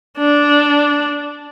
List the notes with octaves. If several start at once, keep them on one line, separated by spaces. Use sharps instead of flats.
D4